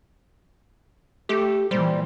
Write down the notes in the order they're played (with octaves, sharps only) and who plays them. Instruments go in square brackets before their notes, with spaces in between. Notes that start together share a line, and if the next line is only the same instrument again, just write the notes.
[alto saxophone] A3 [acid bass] G4
[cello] A#2 E3 [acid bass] G3 [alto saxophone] C5